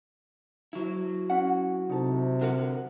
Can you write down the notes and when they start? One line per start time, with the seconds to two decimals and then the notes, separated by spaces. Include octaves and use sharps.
0.73 F#3 E4
1.30 C#4 F#5
1.90 C3 D#4 A4
2.41 D3 F#4 A#4 F#5